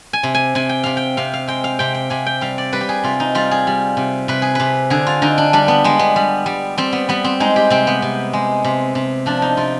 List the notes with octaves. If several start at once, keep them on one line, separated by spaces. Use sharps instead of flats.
G#5
C3
G#5
C3 G#5
G5
C3 F5
G5
C3 F5
F5
G#3 G5
F5
C3 G5
G5
C3 G#5
G5
G3 F5
D5
G3 B4
G4
G#4
C3 F4
D#4
G3 F4
G#4
G3
C3
C3 B4
G#4
C3 B4
D3 G#4
F4
D3 D#4
D4
G3 D4
B3
G3 G#3
B3
G3
G3
G3 C4
B3
G3 B3
C4
G#3 D#4
G4
C3 C4
B3
C3
G#3
C3
C3
F3 D4
D#4
C3 F4